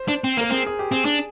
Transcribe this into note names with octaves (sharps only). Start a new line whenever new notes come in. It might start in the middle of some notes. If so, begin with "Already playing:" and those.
Already playing: C5
D4
C4
A#3 A#4
C4 G#4
G#4
G4
C4 G#4
D4